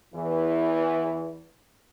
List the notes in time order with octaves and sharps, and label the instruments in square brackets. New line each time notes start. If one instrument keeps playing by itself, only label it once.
[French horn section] E2 E3